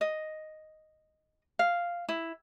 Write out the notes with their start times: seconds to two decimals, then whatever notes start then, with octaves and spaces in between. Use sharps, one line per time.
0.01 D#5
1.59 F5
2.09 E4